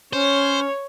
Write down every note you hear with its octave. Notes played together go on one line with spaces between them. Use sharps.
C#4 C5 C#5